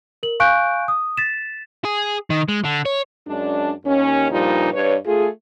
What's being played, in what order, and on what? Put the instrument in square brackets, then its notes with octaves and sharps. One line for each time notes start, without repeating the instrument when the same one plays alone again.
[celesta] A#4 F#7
F5 G#5 C#6 F#6 G6 D7
D#6
A6 B6 E7
[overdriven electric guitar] G#4
D#3
G#3
D3
C#5
[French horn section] F#2 G#3 D4
D#2 C#4
G2 A#2 F3 G3 D#4
G2 B4 C#5
A3 F4 G#4